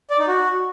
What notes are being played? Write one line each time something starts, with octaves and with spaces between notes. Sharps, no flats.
D5
D#4
F#4